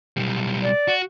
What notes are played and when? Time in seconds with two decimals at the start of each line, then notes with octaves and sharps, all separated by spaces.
0.17 B1 G3
0.63 D5
0.88 F#4